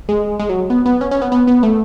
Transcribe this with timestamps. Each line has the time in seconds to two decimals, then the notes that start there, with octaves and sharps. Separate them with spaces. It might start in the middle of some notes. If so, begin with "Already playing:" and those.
0.09 G#3
0.39 G#3
0.49 F#3
0.70 B3
0.86 B3
1.01 C#4
1.11 C#4
1.22 B3
1.32 B3
1.47 B3
1.63 A3